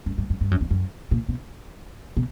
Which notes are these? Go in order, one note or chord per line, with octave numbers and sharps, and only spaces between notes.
F#2
G2
F#2
G2
F#2
E2
F#2
A#2
B2
B2